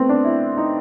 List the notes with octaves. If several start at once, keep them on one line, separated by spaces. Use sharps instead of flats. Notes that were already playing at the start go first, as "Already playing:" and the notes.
Already playing: A3 B3 C4
D4
E4
D#4